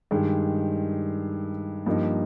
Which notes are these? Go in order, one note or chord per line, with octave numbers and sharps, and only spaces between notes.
G2 D#3 G#3
G2 F3 A#3 D#4